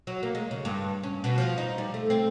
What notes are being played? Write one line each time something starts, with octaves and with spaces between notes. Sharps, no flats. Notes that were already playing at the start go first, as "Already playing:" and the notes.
F#3
A#3
G#3
C#3
G2
C#4
B2
F3
D#4
G3
A3
C4